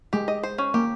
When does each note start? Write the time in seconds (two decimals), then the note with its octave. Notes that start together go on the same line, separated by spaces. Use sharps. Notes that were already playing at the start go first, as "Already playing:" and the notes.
0.13 G#3 G4
0.28 D#5
0.43 C5
0.58 C#4
0.74 A#3 G4